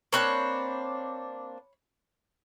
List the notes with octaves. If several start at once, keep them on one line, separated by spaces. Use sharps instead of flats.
A#3 C4 D4 C#5 B5 F#6